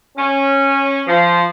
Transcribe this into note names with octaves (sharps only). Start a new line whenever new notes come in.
C#4
F3